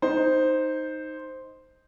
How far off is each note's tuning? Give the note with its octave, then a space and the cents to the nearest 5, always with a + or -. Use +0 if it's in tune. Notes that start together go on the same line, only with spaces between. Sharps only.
D#4 +0 C5 +0